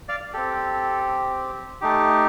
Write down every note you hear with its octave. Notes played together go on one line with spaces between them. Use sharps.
D5 F5
C4 G4 A4
A3 D#4 G4